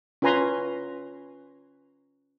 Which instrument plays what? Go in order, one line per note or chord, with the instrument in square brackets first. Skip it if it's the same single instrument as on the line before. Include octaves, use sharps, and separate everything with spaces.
[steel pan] C#4 F4 B4 G#5 A#5 C6